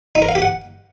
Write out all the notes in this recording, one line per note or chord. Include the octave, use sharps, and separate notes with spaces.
D#4
A#4
F5
G4
F#5